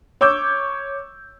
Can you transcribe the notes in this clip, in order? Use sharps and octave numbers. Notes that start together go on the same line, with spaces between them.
C#5 D6 E6 G6